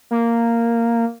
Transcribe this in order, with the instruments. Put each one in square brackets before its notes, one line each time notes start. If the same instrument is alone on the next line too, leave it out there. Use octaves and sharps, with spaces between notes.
[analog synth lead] A#3